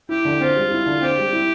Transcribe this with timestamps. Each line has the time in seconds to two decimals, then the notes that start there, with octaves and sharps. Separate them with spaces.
0.09 E4 G4
0.25 D3
0.40 C4 F4
0.56 G3
0.71 E4
0.86 D3
1.02 C4 G4
1.18 G3
1.32 E4